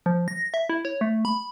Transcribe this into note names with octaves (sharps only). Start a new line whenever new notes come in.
F3
A#6
E5
E4
C#5
A3
B5